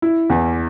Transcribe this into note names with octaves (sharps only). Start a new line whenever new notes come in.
E4
E2